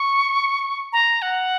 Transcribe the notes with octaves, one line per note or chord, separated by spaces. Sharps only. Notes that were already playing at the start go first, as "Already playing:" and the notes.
Already playing: C#6
A#5
F#5